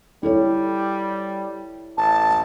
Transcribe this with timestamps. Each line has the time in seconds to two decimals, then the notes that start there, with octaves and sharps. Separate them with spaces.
0.23 G3 E4 A4 C#5
1.98 A1 A5